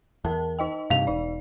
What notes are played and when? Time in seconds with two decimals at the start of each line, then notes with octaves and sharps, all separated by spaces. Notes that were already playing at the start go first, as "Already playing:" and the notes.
0.25 E2 A#4 A5
0.59 D#4 D#5 G5
0.90 G2 C3 F5 F7
1.07 E1 D#4 D5